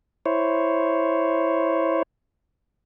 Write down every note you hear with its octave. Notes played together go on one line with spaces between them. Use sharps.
E4 C5 C#5